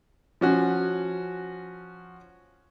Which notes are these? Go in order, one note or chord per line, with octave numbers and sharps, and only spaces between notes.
F3 C#4 F#4